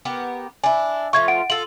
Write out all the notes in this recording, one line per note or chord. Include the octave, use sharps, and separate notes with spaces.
B3 G4 A#4
D4 E4 G#5
F3 A3 F4 C#6 G#6
F#5 D7
F4 A4 F#7